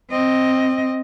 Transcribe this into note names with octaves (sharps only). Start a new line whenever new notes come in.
C4 D#5